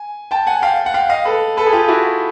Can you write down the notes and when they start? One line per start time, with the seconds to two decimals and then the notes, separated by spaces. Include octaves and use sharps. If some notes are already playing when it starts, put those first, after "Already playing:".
Already playing: G#5
0.31 G5 A5
0.47 F#5 G#5
0.62 F5 G5
0.86 F#5
0.94 F5 G5
1.10 D#5 F5
1.25 A4 B4
1.57 A4 B4
1.66 G#4
1.72 F4 G4
1.88 E4 F#4